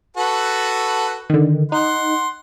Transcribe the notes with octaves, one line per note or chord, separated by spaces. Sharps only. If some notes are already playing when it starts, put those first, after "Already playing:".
F#4 A4 B4
D3 D#3
D#4 F#5 C6